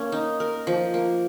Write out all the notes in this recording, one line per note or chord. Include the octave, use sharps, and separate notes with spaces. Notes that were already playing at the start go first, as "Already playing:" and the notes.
Already playing: A#3 C#4
D#4
A#4
F3
A#3